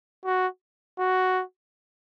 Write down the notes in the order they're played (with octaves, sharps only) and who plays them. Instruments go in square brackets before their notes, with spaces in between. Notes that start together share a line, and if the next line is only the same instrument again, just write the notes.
[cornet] F#4
F#4